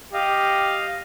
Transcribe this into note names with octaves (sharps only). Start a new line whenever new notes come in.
G4 D#5 F5